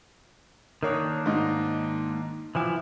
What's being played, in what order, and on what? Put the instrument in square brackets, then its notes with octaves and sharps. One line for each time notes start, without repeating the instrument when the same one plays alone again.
[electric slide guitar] D#3 A#3 D4 [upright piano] A#4 C#5 D#6
[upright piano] G#2 D#4
[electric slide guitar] E3 F3 E4 [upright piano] G#5 D6